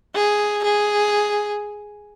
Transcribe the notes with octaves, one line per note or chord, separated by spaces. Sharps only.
G#4
G#4